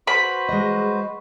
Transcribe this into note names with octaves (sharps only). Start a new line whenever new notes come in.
F#4 B4 C5 B5
G#3 D#5